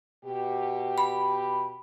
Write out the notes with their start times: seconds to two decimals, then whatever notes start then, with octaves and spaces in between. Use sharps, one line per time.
0.25 B2 G4
0.98 B5